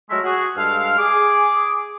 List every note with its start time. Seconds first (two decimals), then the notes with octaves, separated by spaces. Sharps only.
0.10 F#3 G#3 A3 A#4 E5
0.24 F#4 G#4
0.57 G2 G#3 A4 F5
0.98 G#4 D6